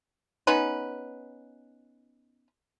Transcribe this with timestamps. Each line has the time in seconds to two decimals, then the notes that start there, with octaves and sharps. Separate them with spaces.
0.47 B3 C#4 D#4 B4